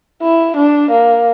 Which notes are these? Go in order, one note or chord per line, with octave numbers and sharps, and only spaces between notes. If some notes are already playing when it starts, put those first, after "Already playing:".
E4
D4
A#3